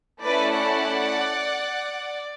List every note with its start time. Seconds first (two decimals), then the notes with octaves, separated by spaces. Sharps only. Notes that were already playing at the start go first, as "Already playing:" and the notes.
0.24 A3 C#4 E4 A4 B4 D5
0.57 D5 F#5